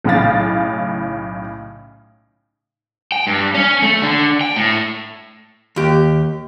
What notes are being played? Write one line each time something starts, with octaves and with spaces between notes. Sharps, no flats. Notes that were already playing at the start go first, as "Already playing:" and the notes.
B1 A2 C#3 F5 A6
G5
G2
C#4
A3
D3
G5
A2
D#2 G4